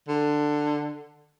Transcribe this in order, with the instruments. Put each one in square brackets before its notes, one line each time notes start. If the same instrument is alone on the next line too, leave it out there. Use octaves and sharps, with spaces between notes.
[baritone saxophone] D3